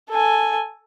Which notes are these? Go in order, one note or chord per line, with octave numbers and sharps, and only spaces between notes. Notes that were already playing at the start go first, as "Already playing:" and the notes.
A4 G#5